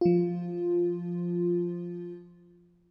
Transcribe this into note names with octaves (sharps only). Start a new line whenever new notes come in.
F3 F4